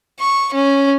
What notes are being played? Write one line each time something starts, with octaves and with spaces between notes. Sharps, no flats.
C#6
C#4